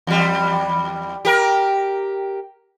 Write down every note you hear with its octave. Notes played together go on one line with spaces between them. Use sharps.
E2 G3
G4 A#4